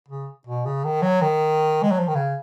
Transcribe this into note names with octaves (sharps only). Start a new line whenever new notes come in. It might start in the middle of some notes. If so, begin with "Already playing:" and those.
C#3
B2
C#3
D#3
F#3
D#3
G#3
F#3
F3
D#3
C#3